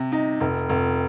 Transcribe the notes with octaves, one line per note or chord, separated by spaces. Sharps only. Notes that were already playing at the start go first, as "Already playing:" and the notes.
Already playing: C3
D#4
F1
F1